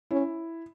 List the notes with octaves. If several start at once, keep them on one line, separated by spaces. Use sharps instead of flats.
C#4 E4